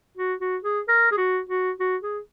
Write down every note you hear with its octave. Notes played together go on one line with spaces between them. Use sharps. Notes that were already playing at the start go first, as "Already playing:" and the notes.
F#4
F#4
G#4
A#4
G#4
F#4
F#4
F#4
G#4